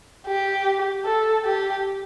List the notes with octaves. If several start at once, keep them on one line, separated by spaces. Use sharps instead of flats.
G4
A4
G4